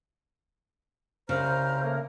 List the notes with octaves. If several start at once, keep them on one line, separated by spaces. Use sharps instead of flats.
C2 C#3 C5 A#5 F6
A3 A#3 A#4